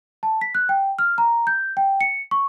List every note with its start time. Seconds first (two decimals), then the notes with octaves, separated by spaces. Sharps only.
0.23 A5
0.41 B6
0.55 F#6
0.69 G5
0.99 F6
1.18 A#5
1.47 G6
1.77 G5
2.01 C#7
2.31 C#6